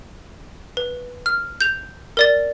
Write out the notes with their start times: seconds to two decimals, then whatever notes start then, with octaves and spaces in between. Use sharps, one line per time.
0.77 B4
1.26 F6
1.61 G6 F7
2.17 A#4 D5 A6